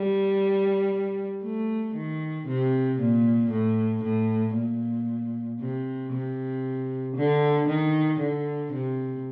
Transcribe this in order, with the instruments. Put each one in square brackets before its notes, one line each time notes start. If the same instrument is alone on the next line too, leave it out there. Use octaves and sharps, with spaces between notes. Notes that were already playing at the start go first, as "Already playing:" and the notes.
Already playing: [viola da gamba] G3
A3
D#3
C3
A#2
A2
A2
A#2
C3
C3
D3
D#3
D3
C3